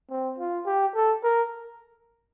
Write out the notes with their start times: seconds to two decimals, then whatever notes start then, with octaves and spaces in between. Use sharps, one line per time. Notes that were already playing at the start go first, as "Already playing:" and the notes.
0.10 C4
0.38 F4
0.66 G4
0.95 A4
1.23 A#4